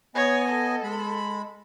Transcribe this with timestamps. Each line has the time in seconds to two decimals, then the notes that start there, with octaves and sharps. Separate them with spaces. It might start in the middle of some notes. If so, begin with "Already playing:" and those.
0.15 B3 C#5 D#5 G#5
0.49 A4
0.83 G#3 B5